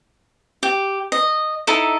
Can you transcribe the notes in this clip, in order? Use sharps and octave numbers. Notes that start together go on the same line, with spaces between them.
G4
D#5
D#4 E4 A4